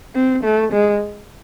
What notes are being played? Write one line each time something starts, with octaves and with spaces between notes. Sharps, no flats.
C4
A3
G#3